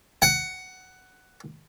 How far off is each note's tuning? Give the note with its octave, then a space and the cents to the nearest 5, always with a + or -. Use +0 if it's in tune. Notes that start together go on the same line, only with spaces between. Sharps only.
F#5 +10